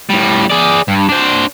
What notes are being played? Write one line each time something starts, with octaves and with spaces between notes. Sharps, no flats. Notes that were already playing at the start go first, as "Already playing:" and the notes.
A2 G3
G#4 D5
G2
D4 C5